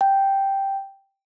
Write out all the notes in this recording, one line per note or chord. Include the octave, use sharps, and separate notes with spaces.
G5